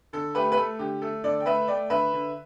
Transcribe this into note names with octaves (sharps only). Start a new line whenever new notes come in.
D3 A4
A3 G4 B4
B4
A3 A4
D3 G4
A3 A4
D3 A4 D5
G5
A3 B4 E5
A3 D5 G5
D3 B4 E5
D3